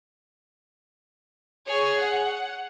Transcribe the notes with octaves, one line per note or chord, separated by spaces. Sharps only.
G#4 C#5
F#5